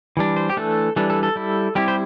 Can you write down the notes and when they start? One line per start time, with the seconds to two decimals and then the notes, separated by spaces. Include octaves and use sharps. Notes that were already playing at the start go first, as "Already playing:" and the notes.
0.17 E3 G3 D4
0.37 C5
0.50 G4
0.57 E3 A3 D4 A4
0.96 E3 G3 D4 A4
1.10 A4
1.23 A4
1.36 G3 E4
1.75 G3 C4 E4 G4
1.88 C5